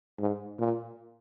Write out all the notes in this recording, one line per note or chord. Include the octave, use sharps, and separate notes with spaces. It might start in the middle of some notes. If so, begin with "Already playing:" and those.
G#2
A#2